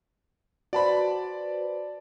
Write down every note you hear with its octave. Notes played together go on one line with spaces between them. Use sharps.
F#4 B4 C5 D5 A5 B5